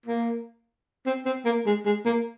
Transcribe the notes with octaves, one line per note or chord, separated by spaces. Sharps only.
A#3
C4
C4
A#3
G#3
G#3
A#3